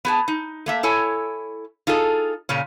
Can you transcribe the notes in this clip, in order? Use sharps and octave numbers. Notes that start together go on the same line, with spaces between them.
B3 G#4 A5
D#4
A3 A#3 E5
E4 A4 C#5 G#5
D#4 F4 G#4 A4
A#2 C#3 C#4